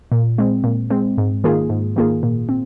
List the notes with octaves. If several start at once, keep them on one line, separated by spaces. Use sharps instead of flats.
A#2
G#3 C4
A#2
G#3 C4
G#2
D#3 A#3 F4 G#4
G#2
D#3 A#3 F4 G#4
A#2
C4